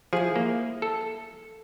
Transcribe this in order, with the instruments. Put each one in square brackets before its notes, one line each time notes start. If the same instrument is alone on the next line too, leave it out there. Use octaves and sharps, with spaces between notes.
[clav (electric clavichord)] F3 [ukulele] E4 G#4
[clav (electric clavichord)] A#3
A4